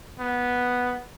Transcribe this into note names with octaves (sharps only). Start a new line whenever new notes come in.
B3